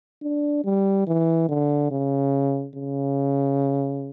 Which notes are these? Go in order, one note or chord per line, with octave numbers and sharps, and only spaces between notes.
D4
G3
E3
D3
C#3
C#3